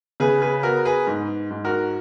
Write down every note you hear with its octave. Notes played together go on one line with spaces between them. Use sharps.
C#3 G#4 B4
G#4 B4
B3 F#4 A#4
G#4 B4
G#2
G#2
F#4 A#4